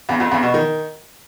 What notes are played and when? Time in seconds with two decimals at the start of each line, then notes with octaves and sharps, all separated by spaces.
0.09 E2
0.20 F2
0.31 E2
0.43 B2
0.54 D#3